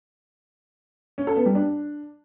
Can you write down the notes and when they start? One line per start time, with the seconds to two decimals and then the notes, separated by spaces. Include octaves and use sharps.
1.18 C#4
1.27 A4
1.36 B3
1.46 G3
1.55 D4